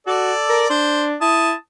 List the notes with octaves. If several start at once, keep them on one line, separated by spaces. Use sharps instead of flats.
F#4 A4 D5
A#4
D4 C5
E4 A5 D#6